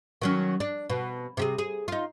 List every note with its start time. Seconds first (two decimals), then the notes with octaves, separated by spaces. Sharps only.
0.22 D#3 F#3 C#4
0.60 D4
0.90 B2
1.37 C3 G4 G#4
1.58 G#4
1.88 D#4 F4